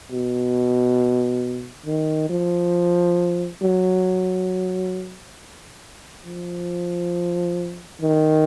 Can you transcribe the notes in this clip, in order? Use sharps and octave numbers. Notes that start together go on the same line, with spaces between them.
B2
D#3
F3
F#3
F3
D#3